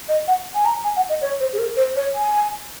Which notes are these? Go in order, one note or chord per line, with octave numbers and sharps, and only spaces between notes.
D#5
F#5
G#5
A#5
G#5
F#5
D#5
C#5
C5
G#4
A#4
C5
C#5
G#5